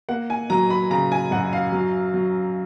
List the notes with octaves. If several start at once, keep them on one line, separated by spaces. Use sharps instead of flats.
A#3 F#5
G#5
F#3 A#5
B5
C#3 A#5
G#5
F#2 F#5
F5
F#3
F#3